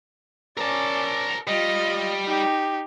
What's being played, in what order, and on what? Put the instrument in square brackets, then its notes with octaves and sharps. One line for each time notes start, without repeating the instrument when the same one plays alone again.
[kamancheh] C#4 D5 [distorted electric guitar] A#4 A5
[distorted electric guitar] G3 [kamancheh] F4 D#5
[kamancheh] D#4 G4